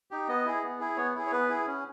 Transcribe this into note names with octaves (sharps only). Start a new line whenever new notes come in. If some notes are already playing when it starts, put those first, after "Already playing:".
D#4 G4
B3 D#5
E4 G#4
B3
E4 G#4
B3 C#5
E4 G#4
C#5
B3 B4
E4 G#4
C#4